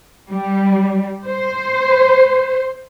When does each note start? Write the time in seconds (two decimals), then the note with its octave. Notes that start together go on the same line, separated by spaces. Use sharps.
0.30 G3
1.27 C5